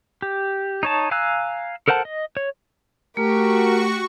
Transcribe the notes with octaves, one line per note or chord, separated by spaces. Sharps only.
G4
D#4 C#5 A5
F5 G#5 A#5 E6 F#6
A4 A#4 C5 F#5 A5
D#5
C#5
A3 F#4 G4 A#4 C#6